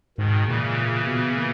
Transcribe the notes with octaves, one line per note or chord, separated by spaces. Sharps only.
G#2 B2 D#3
A#2 C#3 E3
B2
A#2